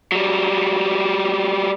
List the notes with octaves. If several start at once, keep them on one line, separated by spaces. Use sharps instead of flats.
F#3 G3